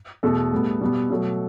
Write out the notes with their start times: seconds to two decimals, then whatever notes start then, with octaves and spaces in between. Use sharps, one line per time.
0.23 E2 B2 A3 A4
0.52 A2 G3 B3
0.81 B2 G3 B3
1.10 B2 F#3 A3